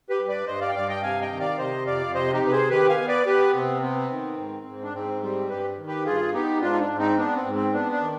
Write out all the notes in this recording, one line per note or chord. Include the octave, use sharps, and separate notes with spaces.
G4 B4
G2
B4 D5
G2 C5 D#5
D5 F5
G5
G2 D5 F5
D#5 G5
C3 F5 G#5
D#5 G5
D#3
D5 F5
C3 C5 D#5
F2 D5 F5
C3 C5 D#5
D#4 G4
C3 B4
G#4 C5
D#3 G4 B4
F5 G#5
B3
B4 D5
B3 G4 B4
C3 C4
B3 C4
D#3
G#2
G#2
D4
G#2 C4
G3 C4
G2 G4 B4
D#3
G4 B4
G2 F4 G#4
B3 D#4 G4
G#2 D4 F4
D#4
D4
G#2
C4 D#4
B3 D4
C4
G#2
C4
B3 D4
D4
D#3